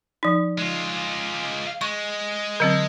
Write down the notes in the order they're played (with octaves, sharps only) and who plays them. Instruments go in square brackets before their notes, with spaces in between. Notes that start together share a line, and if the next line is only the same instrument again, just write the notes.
[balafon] F3 D#4
[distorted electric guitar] G#3 F4
[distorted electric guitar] G#3 [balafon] C#6
[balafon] D3 F#3 C4